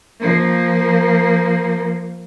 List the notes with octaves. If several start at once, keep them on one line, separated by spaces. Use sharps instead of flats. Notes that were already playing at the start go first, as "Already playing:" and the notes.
F3 A#3